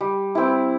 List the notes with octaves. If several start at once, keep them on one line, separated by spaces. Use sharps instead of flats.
G3
C4 E4